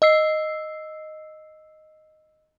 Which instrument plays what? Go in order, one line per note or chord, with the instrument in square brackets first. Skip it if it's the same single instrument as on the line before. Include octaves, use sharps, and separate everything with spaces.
[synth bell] D#5 E6 C7